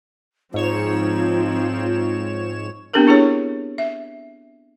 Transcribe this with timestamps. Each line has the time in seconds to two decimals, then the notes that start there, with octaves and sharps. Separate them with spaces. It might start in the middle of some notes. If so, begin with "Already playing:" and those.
0.54 G#2 F3 C4 D#4 C#5 E7
2.94 B3 C4 D4 G4 A4 A#4
3.07 D4 E4 G#4 A4 C#5
3.78 E5